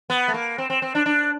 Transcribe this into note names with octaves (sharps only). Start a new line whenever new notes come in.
B3
A3
A#3
C4
C4
C4
D4
D4